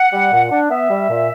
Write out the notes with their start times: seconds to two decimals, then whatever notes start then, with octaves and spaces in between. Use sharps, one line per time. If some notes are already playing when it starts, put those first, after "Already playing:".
Already playing: F#5
0.13 G3
0.32 A#2
0.51 D4
0.71 B3 E5
0.89 G3
1.09 A#2